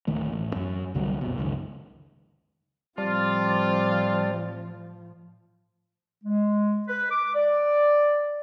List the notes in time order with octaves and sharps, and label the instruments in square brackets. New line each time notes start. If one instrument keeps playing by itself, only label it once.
[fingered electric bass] D1 D#3 A3
A1
F#2
C2 D3 F#3 G3
F#1 C2 B2
C#2 F#2 D#3
[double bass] A2 F3 [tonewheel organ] G3 D5 A5 [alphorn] C4 [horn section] F4
[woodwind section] G#3
B4
D6
D5